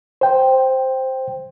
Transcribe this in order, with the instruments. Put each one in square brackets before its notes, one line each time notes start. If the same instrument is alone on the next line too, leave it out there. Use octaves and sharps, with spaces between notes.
[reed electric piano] C5 G5